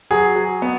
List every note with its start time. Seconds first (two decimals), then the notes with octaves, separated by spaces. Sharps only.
0.11 F#3 G#4
0.36 F#3
0.62 B3